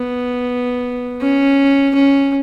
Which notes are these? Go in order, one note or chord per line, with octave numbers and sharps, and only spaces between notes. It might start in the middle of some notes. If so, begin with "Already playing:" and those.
Already playing: B3
C#4
C#4